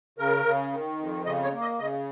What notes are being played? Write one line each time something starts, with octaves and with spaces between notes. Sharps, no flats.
C#3 A#4
C#3
D#3
F2
C#3 D#5
C#5
A#3
D#5
C#3 D#5